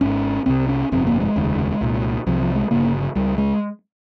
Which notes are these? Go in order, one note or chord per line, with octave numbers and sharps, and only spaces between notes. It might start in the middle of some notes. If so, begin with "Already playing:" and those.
G#1 G#2 C#4
C2 C3 C4
C#4
G1 F2 C3 C4
A#3
G#3
F1 D#2 C#3
C2 A#2
C2 C3 F3
F3
G#3
G1 F2 C#3 A#3
C#2 C#3 G3
G#3